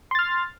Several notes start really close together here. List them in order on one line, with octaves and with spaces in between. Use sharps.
C6 A6 F6